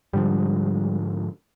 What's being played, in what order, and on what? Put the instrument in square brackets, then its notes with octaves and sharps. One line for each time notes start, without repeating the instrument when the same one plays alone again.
[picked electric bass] G#2 D3 F3 [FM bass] G3